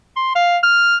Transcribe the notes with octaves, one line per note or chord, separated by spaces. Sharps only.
C6
F5
F6